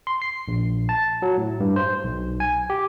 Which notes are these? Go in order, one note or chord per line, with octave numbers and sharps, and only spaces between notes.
C6
C7
A#1
A5
F#3
A2
G2
C5
B1
G#5
G4